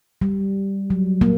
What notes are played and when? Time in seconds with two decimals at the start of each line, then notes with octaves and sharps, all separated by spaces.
0.22 G3
0.90 F#3
1.21 A#3